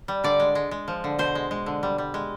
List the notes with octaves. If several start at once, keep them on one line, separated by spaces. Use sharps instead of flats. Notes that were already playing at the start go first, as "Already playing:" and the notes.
G3
D3 D5
G#3
G#3
G#3
F3
D3
B2 C5
G#3
G#3
D3
G3
G3
G#3